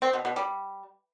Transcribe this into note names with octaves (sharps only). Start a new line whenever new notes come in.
C4
B2
B2
G3